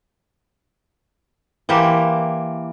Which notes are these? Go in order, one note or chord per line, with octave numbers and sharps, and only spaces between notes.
E3 A#3 G4 C5